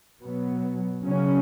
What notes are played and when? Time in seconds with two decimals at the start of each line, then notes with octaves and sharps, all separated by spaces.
0.21 B2 F#3 B3
1.03 C#3 F#3 C#4